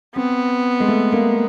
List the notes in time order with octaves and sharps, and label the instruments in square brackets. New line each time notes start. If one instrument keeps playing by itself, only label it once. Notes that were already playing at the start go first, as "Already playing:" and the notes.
[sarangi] B3 [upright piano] C4
[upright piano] G#3
A3
A#3